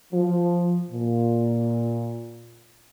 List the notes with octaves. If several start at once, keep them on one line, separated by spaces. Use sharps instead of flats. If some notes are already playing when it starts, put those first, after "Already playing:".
F3
A#2